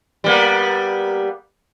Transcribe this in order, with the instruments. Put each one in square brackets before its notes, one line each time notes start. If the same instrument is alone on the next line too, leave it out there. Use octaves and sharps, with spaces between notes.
[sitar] G3 A#3 B3